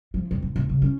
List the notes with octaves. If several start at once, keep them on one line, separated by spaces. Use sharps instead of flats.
F3
F2
D3
D#2
C#3
C#4